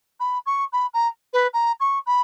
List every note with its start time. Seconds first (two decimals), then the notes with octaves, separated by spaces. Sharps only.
0.20 B5
0.46 C#6
0.73 B5
0.94 A#5
1.33 B4
1.53 A#5
1.80 C#6
2.06 B5